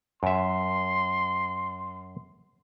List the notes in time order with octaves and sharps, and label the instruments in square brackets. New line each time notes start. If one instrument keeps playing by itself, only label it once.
[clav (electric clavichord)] F#2 E5 [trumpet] C6